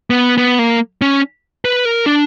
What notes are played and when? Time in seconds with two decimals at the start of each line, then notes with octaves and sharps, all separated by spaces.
0.10 B3
0.38 B3
0.59 A#3
1.02 C#4
1.65 B4
1.85 A#4
2.06 D4